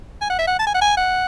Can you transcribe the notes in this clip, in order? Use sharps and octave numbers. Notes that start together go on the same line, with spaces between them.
G#5
F#5
E5
F#5
A5
G#5
F#5
G#5
F#5